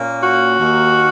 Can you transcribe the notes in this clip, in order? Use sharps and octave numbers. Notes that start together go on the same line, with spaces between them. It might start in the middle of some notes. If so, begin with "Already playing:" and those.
Already playing: A#2 A#3 C#4
F#4
D#2 D#3 A#3